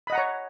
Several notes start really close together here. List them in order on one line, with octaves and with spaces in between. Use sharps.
B5 D#5 F#5 A#5 C#5